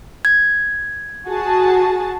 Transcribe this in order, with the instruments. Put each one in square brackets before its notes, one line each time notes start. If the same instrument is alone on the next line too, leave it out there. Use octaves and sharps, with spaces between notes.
[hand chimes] G#6
[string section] F#4 G#4 A5